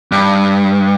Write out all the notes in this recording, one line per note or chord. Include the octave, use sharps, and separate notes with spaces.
G2